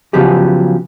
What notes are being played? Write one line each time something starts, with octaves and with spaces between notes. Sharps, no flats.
C#3 F3 F#3 B3 G4 G#4